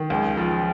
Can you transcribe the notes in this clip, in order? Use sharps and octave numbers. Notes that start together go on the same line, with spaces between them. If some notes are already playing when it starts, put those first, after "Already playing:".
Already playing: D#3
C#2
F3